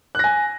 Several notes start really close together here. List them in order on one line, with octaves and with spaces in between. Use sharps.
F#6 A#6 G#5